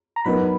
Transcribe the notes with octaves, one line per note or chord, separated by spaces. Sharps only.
A#5
F#3 B3 D#4 F#4 A#4 B4 B5